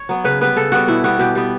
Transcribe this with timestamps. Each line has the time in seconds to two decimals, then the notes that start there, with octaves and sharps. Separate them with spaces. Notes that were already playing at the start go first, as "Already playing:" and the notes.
Already playing: C#5
0.09 F#3 B3
0.24 C#3 B4
0.41 G3 B3 B4
0.56 C#3 A4
0.72 G3 B3 F#4
0.88 B2 E4
1.04 G3 B3 F#4
1.19 B2 G4
1.35 G3 B3